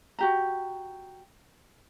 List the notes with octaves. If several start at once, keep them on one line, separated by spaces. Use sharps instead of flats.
F#4 G4 A#5